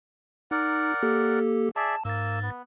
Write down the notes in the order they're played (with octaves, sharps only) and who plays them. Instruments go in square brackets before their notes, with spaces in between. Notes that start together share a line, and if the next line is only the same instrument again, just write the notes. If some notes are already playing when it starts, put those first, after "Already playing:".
[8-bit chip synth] D#4 [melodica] A#4 D5 F#5
[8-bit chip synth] A#3 G4 A4
[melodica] G#4 D5 E5 [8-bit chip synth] A5
[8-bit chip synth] G#2 A6 [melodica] A#3 E6
[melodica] B3